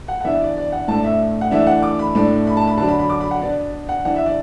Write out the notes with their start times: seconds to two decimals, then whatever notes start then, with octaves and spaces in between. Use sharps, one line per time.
0.08 F#5
0.21 F#5
0.24 E3 B3 D4 E5
0.41 D5
0.57 D5
0.72 F#5
0.88 A2 A3 D4 A5
1.04 E5
1.41 F#5
1.51 E3 A3 D4 E5
1.67 F#5
1.83 D6
1.99 B5
2.15 A2 A3 D4
2.47 B5
2.57 A5
2.67 B5
2.78 D3 F#3 D4 A5
2.88 B5
2.99 B5
3.09 D6
3.21 B5
3.31 F#5
3.42 B2 B3 D4 D5
3.89 F#5
4.05 E3 D4 F#5
4.16 E5
4.26 D5